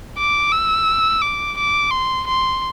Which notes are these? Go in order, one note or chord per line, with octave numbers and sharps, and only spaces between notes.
D6
E6
D6
D6
C6
C6